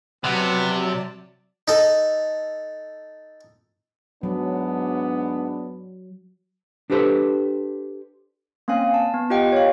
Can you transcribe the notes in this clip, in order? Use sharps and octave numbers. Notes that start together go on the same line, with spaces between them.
C3 F#3 B3 D5 A5
D#4 A4
G#2 F#3 B3 D4
D4 G4 A4 B4 C5
A#3 C4 C#4 F5 G#5
A5
B3
F4 G4 D#5 F#5 G5
C#5 F5